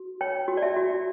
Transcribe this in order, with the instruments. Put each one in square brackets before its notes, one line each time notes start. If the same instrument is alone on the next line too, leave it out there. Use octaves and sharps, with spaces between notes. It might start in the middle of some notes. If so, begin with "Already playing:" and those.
Already playing: [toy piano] F#4
C#5 G5
F#4
D5
E5
F#4